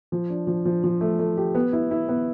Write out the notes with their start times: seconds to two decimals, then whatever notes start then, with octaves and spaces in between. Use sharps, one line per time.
0.12 F3
0.30 D4
0.47 F3
0.65 F3
0.84 F3
1.01 A3
1.19 A3
1.37 G4
1.55 B3
1.73 E4
1.91 E4
2.09 B3